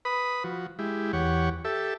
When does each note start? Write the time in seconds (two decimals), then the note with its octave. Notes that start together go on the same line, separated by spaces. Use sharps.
0.05 B4 B5 D#6
0.44 F3 F#4
0.79 G#3 E4 G4
1.13 E2 G4 C#5 F#5
1.65 G4 A4 E5